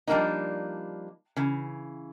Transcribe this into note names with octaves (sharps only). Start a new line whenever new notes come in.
F3 G3 G#3 A#3 D4 D#4
C#3 E3